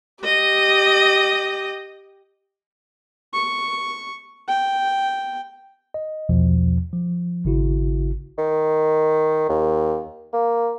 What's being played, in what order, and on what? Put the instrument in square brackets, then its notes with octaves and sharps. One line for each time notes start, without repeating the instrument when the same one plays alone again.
[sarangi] G4 [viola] D#5
[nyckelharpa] C#6
G5
[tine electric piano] D#5
B1 E2 B2 F3
F3
G#1 C#3 E4 F#4
[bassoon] D#3
D#2
A#3